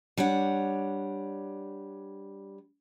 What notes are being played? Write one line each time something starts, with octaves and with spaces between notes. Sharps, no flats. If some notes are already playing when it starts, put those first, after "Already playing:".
G3 D4 C#5 F#5